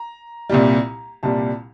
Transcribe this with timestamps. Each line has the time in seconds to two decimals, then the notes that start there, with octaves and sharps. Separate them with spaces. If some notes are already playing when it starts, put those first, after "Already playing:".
Already playing: A#5
0.49 C2 A#2 G3
1.23 C2 A#2 G3 A5